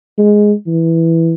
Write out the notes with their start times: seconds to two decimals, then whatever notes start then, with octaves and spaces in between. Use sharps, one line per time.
0.18 G#3
0.67 E3